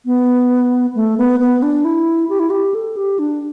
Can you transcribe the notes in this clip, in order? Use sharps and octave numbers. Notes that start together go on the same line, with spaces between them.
B3
A3
B3
B3
D4
E4
G4
E4
G4
A4
G4
D4